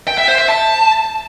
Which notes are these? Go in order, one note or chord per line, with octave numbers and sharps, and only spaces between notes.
G5
E5
C5
E5
A5